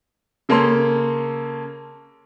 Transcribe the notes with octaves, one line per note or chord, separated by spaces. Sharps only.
C#3 A#3 C#4 A4 C6